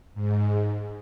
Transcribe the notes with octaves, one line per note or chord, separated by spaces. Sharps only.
G#2